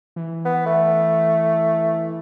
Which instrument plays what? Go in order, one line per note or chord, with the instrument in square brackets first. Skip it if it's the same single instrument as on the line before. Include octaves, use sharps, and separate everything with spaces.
[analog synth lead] E3
[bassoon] B3
A3